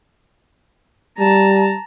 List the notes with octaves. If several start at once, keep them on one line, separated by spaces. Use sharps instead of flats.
G3 A5 A#5